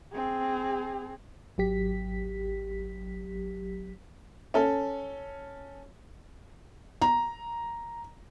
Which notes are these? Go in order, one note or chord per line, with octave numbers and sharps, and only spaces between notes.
C4 G#4
G#1 F#3 G4 B6
C#4 A4
A#5